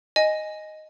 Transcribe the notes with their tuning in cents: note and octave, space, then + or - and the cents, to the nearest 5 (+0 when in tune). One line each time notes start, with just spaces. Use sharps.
D#5 +0 G#5 +0